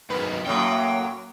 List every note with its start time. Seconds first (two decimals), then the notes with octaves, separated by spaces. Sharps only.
0.10 G#2 D#3 F#3 B4
0.46 F#2 A2 F#3 A#3 G5